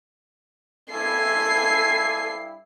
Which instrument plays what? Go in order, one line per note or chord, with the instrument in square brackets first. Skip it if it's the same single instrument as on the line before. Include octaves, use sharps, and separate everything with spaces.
[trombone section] G2 E4 [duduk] A4 [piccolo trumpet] G#5 [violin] C7